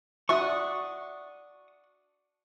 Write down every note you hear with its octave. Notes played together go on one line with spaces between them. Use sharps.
D4 F#4 E5 C#6 D#6